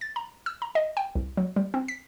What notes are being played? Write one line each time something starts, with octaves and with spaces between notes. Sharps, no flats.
A6
A#5
E6
A#5
D#5
G5
C2
F#3
G3
C4
B6